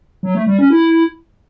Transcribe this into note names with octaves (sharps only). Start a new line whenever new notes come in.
F#3
A3
G3
C#4
E4